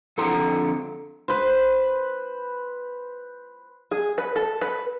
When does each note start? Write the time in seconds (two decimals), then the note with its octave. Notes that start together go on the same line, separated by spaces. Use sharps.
0.18 F2 D3 A4 F#5 A#5 C6
1.28 B4 C5
3.91 G#4
4.18 B4
4.36 A4
4.61 B4